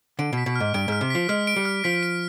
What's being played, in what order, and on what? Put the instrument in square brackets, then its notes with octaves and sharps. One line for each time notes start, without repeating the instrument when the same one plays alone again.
[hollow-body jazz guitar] D3 [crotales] D7
[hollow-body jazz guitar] B2
[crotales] B6
[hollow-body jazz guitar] B2
[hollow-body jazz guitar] G#2 [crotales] F6
[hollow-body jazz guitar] G2 [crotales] D7
[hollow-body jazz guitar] G#2 [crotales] F6
[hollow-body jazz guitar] C3
[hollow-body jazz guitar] F3 [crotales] B6
[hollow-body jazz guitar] G#3 [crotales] F6
[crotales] D7
[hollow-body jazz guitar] G3
[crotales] F6
[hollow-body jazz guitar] F3 [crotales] B6
[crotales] D7